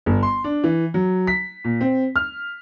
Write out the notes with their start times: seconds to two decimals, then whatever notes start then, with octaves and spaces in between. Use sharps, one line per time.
0.06 G1
0.23 C6
0.44 D4
0.64 E3
0.94 F#3
1.27 B6
1.64 A#2
1.81 C4
2.16 F6